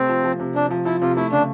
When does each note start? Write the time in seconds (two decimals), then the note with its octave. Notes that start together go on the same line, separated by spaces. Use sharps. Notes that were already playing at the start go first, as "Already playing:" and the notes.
Already playing: C3 A3 C4
0.09 F3
0.24 F3
0.40 C3
0.55 C3 D4
0.71 F3
0.85 F3 E4
1.02 C3 F4
1.16 A3 E4
1.32 C#3 D4